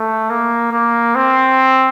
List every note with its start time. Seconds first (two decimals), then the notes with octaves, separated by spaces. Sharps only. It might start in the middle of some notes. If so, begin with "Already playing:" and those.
Already playing: A3
0.30 A#3
0.72 A#3
1.15 C4